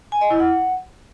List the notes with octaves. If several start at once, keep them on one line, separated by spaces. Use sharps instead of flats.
G#5
D#5
E4
F#5